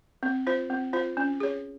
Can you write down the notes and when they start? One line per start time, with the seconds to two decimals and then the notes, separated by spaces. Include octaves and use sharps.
0.23 C4
0.47 F4 C5
0.70 C4
0.93 F4 C5
1.17 C#4
1.40 G#4 C#5